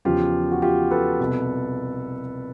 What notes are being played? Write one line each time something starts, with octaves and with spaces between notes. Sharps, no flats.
E2 C#3 F3 F4 G4
F#4
F4 G4
A4 B4
C2 B2